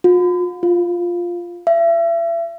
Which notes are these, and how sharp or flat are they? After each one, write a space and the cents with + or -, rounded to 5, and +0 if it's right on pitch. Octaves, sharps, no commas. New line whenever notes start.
F4 +40
F4 +5
E5 +35